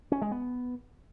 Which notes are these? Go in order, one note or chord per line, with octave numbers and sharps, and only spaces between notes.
C#4
G#3
B3